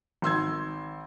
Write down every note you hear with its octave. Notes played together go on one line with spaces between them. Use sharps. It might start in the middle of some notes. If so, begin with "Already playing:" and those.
G#1 C6 E6 G#6